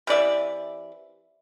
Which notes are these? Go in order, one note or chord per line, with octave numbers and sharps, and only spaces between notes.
C3 E3 D5 E5